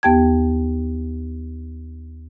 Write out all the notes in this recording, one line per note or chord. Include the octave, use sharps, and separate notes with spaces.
D#2 B3 G4 G5 A5 G#6